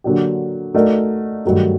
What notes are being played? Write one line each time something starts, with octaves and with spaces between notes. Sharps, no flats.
D3 F#3 A#3 D4 G4
A3 D#4 F#4 A#4 D5
G2 D#3 F#3 A3 D#4